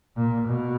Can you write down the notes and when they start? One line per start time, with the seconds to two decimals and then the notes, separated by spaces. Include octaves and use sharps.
0.16 A#2
0.47 B2